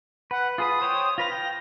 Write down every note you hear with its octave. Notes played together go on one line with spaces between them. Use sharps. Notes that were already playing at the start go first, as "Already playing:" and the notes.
B4 F#5
F4 G#4 B4 D#6
C5 C#5 G5
F4 B4 F5 A#6
G5